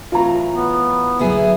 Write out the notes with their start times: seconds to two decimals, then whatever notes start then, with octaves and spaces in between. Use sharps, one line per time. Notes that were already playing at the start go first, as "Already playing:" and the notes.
0.12 A2 E3 F#3 F4 A#5
0.55 B3
1.19 D2 F#3 B3 E4 G#4